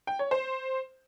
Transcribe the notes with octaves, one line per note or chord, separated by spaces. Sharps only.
G5
C#5
C5